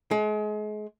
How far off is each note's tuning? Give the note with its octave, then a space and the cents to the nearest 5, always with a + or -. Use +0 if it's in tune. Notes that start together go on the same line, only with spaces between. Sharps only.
G#3 +35